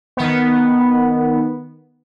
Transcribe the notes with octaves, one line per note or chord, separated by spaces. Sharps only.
D#3 B3